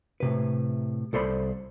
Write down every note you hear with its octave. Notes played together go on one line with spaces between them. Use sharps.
A2 C3 B4
C2 A4 C5 D5 B5